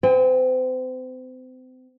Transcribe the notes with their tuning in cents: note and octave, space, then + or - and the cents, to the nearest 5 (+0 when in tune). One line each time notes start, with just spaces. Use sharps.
C4 -35 G5 +40